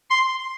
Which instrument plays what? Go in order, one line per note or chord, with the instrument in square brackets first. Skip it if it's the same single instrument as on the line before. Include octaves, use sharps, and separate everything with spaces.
[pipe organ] C6